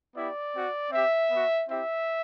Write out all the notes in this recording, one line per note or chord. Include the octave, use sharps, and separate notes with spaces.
B3 E4 G4 D5
C4 F#4
C4 G4 E5
B3 F#4
C4 E4 G4 E5